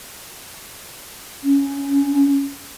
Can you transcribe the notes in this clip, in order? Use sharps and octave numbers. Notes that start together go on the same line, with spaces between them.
C#4